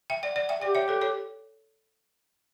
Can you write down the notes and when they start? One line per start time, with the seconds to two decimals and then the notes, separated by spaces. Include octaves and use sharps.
0.10 E5 G5
0.23 D5 F#5
0.36 D5 F#5
0.49 E5 G5
0.61 G4 D5 F#5
0.75 C#5 E5
0.88 A4 C#5
1.01 A4 C#5